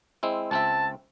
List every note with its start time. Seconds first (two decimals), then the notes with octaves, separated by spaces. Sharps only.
0.23 G#3 C4 E4
0.51 C#2 C4 E5 A5